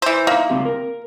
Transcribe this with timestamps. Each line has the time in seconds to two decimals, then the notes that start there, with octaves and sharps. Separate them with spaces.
0.02 E3 C5
0.27 A#3 D#4 E5
0.50 C#2 C4 G4
0.65 A#4